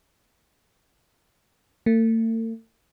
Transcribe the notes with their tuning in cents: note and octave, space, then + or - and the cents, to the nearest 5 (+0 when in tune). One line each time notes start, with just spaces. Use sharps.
A3 +45